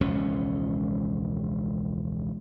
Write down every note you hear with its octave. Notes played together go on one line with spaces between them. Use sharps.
E1 C#2 F3 C#4